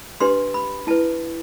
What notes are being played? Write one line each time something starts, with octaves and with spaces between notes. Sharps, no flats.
D4 G4 B4 C6
B5
E4 B4 A5